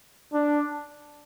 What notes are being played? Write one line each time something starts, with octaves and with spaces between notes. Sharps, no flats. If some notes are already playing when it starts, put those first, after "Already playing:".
D4